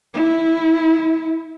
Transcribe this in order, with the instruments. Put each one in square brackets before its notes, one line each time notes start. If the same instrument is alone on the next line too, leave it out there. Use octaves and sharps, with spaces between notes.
[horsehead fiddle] E4